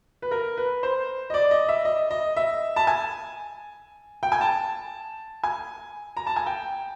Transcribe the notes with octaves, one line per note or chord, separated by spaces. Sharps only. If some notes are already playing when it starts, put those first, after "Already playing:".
B4
A#4
B4
C5
D#5
D5
D#5
E5
D#5
D#5
E5
A5
G#5
G5
G#5
A5
G#5
A#5
A5
G#5
G5